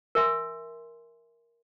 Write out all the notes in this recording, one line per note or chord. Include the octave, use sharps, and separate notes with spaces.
A#4 E5 G#5 C6